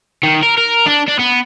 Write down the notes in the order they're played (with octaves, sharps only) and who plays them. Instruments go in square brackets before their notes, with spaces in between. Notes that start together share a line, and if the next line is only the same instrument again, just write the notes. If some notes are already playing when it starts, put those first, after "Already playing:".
[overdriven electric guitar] D#3
A#4
A#4
D4
D4
B3